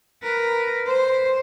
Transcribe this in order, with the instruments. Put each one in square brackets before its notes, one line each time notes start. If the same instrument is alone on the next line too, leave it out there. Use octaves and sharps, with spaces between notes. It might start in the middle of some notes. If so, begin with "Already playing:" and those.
[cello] A#4 B4
C5